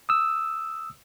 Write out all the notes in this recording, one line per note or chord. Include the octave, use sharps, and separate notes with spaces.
D#6 E6